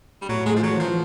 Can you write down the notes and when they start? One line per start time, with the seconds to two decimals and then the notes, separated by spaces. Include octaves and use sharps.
0.22 G3
0.29 A2 F#3
0.46 G#3 A3
0.56 F3
0.63 E3 F#3
0.80 E3 F3